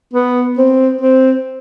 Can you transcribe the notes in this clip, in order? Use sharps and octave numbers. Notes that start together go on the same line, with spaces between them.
B3
C4
C4